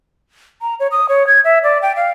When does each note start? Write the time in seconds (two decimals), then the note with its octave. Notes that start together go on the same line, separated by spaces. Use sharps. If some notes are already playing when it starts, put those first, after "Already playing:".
0.62 A#5
0.80 C#5
0.91 D#6
1.09 C#5
1.27 G#6
1.45 E5
1.64 D5
1.82 G5
1.96 F5